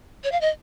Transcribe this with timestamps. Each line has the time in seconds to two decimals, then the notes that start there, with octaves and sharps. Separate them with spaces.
0.24 C#5
0.32 F5
0.41 D#5